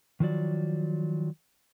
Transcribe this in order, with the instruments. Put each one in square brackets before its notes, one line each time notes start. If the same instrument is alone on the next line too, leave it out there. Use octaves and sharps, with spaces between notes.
[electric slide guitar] D#3 F3 F#3 D5